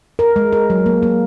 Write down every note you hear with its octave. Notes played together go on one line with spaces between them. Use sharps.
A#4
G#3
A#4
F#3
A#3
A#3